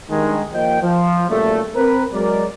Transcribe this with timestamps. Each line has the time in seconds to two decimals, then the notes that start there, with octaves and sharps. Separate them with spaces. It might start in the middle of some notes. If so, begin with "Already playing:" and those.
0.10 G2 D#3 G#3
0.52 D#2 F3 A#3 D#5 G5
0.82 F3
1.29 B1 A#2 C#3 G3 A3
1.75 C4 A#4 B4
2.13 F#3 G#3 A#4 D5